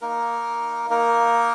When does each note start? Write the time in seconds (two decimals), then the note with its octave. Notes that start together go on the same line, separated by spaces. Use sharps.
0.01 A#3 D#4 A#4
0.90 A#3 D#4 A#4